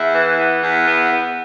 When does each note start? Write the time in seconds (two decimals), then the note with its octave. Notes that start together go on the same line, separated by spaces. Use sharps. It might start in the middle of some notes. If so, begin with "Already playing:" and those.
Already playing: E2 E4
0.14 E3
0.39 B3
0.63 E2
0.86 B3
1.11 B3